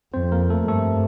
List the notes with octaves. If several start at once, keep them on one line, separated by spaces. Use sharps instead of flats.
F2 C4 C5
A#3 A#4
A3 A4
G2 A3 A4